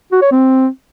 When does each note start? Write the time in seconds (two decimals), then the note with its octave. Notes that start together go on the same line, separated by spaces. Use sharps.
0.12 F#4
0.22 C#5
0.31 C4